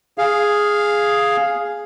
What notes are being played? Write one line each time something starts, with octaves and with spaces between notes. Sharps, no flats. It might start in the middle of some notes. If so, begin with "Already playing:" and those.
G#4 F5